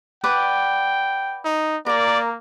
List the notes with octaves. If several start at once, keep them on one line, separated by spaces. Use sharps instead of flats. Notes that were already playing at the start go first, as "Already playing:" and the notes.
B4 D5 F#5 G5
D#4
A#3 A#4 D5 A#5